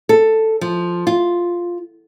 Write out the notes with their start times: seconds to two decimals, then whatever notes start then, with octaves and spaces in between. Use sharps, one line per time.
0.09 A4
0.61 F3
1.07 F4